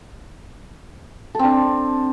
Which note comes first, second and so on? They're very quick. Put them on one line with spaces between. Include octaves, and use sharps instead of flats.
A4 C4 D4